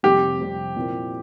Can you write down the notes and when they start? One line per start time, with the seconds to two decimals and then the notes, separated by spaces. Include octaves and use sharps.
0.03 F2 C3 G3 C4 G4
0.40 F2 C3 G3 C4
0.76 A#2 F3 C4 E4 A#4